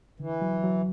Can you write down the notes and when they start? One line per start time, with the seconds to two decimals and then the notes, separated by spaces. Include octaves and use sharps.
0.20 D3 E3
0.42 F#3
0.64 F#3